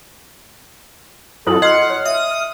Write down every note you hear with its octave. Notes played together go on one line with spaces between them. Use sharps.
F#2 E4 A4 D#6 F#7
D#5 F#5 C6 F6 C7 F#7
C#5
E5 D#6